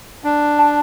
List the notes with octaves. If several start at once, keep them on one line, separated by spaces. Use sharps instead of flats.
D4
A5